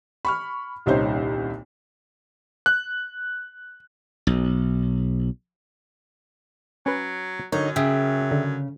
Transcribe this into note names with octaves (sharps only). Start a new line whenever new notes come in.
B5 C#6 F6
D#1 C2 C#4 D#4 C5
F#6
B1
F#3 C#4 B4
F#2 D3 D#4 A#4 C#5
C#3 G#4 E5 G5
D3